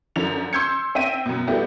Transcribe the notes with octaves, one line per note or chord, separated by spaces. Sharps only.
F#2 D3 F3 F7
C6 E6 G6 G#6 C#7
C4 E5 G5 D#7
F#2 B2
G3 A3 B3 E4 F#4 G4